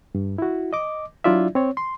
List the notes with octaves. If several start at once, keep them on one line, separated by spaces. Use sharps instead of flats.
G2
E4 F#4
D#5 D6
F#3 D4 E4 F4 D5 E5
C4 C#5
C6